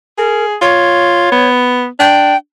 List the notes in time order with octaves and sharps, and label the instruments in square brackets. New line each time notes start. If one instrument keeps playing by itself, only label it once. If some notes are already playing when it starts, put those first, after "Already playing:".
[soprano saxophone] G#4 [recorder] A#4
[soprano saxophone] F4 [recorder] C#5
[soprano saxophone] B3
[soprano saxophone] D4 [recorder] G5